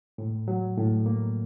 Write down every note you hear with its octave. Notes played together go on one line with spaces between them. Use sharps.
A2
F#3
A2
A#3